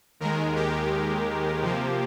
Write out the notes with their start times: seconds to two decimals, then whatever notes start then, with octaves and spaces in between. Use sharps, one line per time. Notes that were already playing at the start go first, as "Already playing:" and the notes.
0.20 D#2 D#3 G#3 A#4
0.56 G4
1.62 C3 F3 A#3